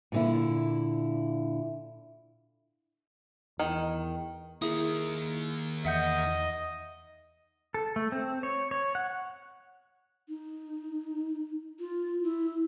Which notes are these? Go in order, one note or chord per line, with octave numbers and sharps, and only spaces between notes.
A#2 D3 E4
E2 D#3
D#3 A#3 E4 G#4 D#6
E2 D#5 E5 F#5 G6
A4
A3
C4
C#5
C#5
F#5
D#4
F4
E4